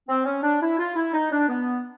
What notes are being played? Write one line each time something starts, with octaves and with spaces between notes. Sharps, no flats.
C4
C#4
D4
E4
F4
E4
D#4
D4
B3